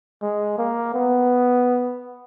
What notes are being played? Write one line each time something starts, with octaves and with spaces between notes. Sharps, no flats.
G#3
A#3
B3